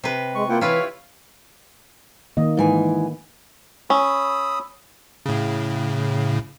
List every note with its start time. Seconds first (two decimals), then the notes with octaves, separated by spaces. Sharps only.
0.04 C3 B4
0.35 G#3 C#6
0.49 A#3 E4 F4 F#5 G5
0.61 E3 E4 F4 B4 C#5 F5
2.37 D#3 A#3 D#5
2.57 G#2 E3 G#5
3.90 C#4 B5 D#6 E6
5.26 A2 C#3